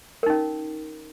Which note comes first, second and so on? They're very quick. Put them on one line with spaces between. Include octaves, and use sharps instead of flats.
A#4 D#4 C#4